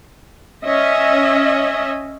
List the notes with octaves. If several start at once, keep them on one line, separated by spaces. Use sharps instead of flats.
C#4 D#5 E5